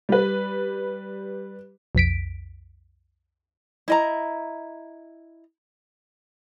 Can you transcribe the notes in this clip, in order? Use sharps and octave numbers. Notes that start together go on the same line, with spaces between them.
G3 B4
B1 F2 B6 D7
E4 D#5 A#5